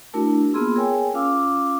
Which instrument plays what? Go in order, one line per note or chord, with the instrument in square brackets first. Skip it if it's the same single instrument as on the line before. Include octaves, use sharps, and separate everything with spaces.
[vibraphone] A3 D4 E4 F#4 A#4 A5
A#3 B3 F4 G#4 C6 E6
G#4 A#4 C#5 G5 G#5
C#4 F4 F5 D6 E6